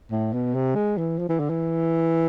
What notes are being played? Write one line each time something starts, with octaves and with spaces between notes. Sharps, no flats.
A2
B2
C3
G#3
E3
F3
E3
D3
E3